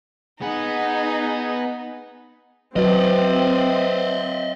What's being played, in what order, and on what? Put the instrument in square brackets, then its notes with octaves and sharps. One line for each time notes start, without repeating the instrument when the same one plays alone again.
[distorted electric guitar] B3 F#5 [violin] D#4 [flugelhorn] G#4
[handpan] F#3 F#4 [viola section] C4 [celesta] B4 [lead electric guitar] D5 D#5